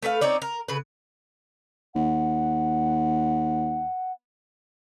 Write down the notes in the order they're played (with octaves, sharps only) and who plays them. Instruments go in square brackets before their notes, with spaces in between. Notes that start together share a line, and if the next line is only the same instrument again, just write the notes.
[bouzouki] A3 B4 C5 F5
C4 C#4 D#4 D5
A#4
C#3 B4
[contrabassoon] D#2 [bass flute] F#5